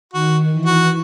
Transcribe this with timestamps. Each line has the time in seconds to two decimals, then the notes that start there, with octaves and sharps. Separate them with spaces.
0.13 D#3 F#4
0.53 E3
0.66 F#4